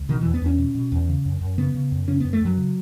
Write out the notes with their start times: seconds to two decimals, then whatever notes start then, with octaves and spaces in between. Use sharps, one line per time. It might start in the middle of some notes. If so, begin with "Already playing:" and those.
Already playing: C#2
0.09 B2 D#3
0.21 E3
0.26 E2
0.34 B3
0.42 E2 C#4
0.58 B2
0.75 B2
0.92 E2
1.09 C#3
1.25 F#2
1.41 F#2
1.58 C#3 B3
1.75 C#3
1.92 F#2
2.07 C#3 C#4
2.20 B3
2.24 F#2
2.33 A3
2.41 F#2 F#3
2.57 C#3